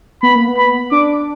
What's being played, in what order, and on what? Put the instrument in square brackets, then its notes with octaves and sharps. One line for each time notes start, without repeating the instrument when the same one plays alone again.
[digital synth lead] B3 [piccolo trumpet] B5
[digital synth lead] A#3
B3
[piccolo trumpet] B5
[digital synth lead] D4 [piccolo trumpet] D6